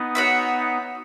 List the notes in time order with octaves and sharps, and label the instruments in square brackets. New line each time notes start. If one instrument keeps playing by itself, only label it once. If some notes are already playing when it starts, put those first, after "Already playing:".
Already playing: [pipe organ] B3 D#4
[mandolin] F#4 C#5 E5